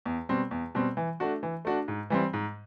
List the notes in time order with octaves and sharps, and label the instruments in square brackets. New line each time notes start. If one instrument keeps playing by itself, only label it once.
[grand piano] E2
B2 G3 C4
E2
B2 G3 C4
E3
A3 D4 F#4
E3
A3 D4 F#4
G#2
E3 G3 C4
G#2